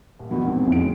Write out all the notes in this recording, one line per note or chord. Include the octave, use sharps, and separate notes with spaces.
D#1
A#1 E2 B2 F#3 B3
G#2 C4
F2 A2 C#3 G#3 D7